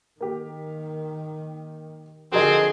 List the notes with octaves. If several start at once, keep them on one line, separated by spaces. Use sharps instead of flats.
D#3 A#3 G4
D3 F3 C4 F#4 G#4 A#4 D#5